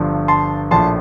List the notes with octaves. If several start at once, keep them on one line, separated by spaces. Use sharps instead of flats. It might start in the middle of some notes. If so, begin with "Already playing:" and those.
Already playing: G1 G2 F3
A5 C6
A#1 A2 F3 A5 C6